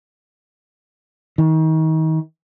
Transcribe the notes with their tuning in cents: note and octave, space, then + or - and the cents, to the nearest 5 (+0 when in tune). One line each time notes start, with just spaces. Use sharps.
D#3 +35